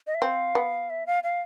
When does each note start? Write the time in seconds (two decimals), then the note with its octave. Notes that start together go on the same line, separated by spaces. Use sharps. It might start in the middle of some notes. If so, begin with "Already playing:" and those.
0.07 D#5
0.14 E5
0.21 C4 F5
0.55 B3
0.90 E5
1.06 F5
1.24 F5